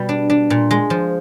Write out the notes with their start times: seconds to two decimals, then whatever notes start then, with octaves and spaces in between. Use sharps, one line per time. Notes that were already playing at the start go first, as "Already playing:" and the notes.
Already playing: B2 G3
0.09 D4
0.30 D4
0.50 A#2
0.71 G#3
0.90 F3